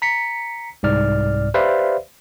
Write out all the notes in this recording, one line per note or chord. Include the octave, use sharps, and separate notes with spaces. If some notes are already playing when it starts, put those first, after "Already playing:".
A#5 B6 C#7
C2 G#2 D5 F6
G4 B4 C5 D5 E5 F5